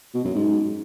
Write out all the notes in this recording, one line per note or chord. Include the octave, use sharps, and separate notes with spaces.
B2
F#2
G#2